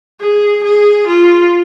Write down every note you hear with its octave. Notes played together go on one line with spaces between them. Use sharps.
G#4
G#4
F4